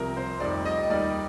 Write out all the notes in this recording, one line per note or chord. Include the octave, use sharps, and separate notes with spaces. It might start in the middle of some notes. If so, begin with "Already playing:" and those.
Already playing: C2 C3 F3 A#4
C5
F1 F2 D#3 G3 D5
D#5
D#2 D#3 G3 D5